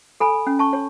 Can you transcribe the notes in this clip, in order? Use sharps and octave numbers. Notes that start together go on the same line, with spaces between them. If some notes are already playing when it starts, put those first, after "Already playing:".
A4 G#5 B5
C#4
A5 C#6
C#5